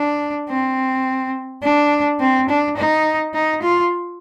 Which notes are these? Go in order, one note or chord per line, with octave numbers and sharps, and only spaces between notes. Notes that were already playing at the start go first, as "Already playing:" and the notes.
Already playing: D4
C4
D4
C4
D4
D#4
D#4
F4